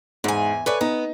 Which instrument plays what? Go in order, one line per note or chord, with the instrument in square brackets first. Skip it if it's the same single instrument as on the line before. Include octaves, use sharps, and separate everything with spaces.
[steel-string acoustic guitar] E2 G#5 [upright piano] G#2
[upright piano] A4 D5 [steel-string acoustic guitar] B4 C#5 G#5
[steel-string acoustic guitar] B3 [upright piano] D#4